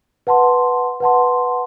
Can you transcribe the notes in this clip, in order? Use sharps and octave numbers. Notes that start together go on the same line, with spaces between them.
B4 F#5 A5 C6
B4 F#5 A5 C6